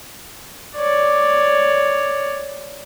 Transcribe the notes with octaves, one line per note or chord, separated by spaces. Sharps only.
C#5 D5